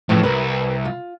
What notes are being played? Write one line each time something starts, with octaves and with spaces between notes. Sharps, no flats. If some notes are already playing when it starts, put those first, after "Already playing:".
F2 A2 C#3 E3
C2 A#4 B4
F4